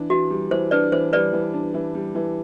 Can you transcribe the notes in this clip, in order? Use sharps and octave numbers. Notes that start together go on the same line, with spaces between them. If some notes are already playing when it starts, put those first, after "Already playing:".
Already playing: E3 D4
E3 F#4
G3
E3 C5
D4 B4 D5
E3 C5
G3 B4 D5
E3
D4
E3
G3
E3